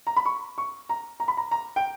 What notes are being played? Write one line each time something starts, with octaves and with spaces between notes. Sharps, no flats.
A#5
B5
C#6
C#6
A#5
A#5
B5
A#5
A#5
G5